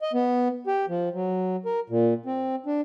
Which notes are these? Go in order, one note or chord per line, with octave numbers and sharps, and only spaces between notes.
D#5
B3
G4
F3
F#3
A#4
A#2
C4
D4